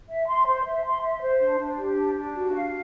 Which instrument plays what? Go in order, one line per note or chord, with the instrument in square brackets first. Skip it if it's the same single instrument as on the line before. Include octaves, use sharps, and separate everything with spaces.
[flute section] E5
C6
C5
E5
C6
E5
C5
D4
D4
G4
D4
D4
F#4
F5